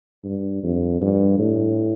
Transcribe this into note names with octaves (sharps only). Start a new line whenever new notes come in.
G2
F2
G2
A2